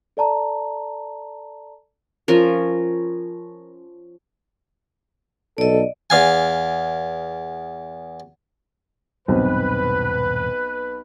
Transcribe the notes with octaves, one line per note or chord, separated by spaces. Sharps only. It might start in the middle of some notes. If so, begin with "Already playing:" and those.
A4 D5 A5 A#5
F3 C#4 A#4
B1 A4 D5 D#5
E2 F5 G#5
D#1 B1 G2 B2 C4 B4 C5